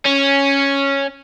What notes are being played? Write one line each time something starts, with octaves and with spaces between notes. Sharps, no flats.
C#4